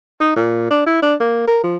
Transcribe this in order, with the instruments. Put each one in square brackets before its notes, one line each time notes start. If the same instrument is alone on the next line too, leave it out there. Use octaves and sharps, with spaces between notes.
[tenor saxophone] D#4
A#2
D4
E4
D4
A#3
A#4
F3